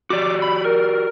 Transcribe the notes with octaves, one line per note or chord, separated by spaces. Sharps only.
F#4 G4 D5 D6
B5
A#4